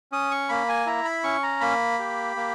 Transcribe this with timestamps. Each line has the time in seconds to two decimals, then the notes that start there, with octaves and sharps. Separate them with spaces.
0.12 C#4 D#6
0.31 C#6
0.49 A#3 B5
0.69 G#5
0.86 E4 A#5
1.05 B5
1.24 C#4 C#6
1.43 A#5
1.61 A#3 B5
1.99 G4
2.36 A#3